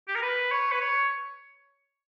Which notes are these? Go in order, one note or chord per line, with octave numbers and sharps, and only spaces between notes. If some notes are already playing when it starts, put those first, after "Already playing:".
G4
A#4
B4
C#5
B4
C#5